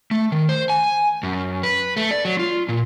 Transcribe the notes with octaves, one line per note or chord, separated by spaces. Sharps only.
A3
D#3
C5
G#5
F#2
B4
A3
D5
F#3
F4
A#2